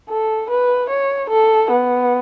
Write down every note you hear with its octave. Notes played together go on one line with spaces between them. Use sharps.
A4
B4
C#5
A4
B3